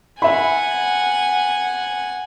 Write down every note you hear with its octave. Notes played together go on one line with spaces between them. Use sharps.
E5 F#5 G#5 B5